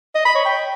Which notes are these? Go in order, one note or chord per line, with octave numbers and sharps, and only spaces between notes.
D#5
B5
C#5
G5